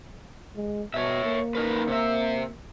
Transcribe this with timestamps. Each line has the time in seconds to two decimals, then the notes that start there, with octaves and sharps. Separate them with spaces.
0.56 G#3
0.94 B2 C#5 E5
1.25 A#3
1.55 D#4 A#4 B4
1.88 C3 E5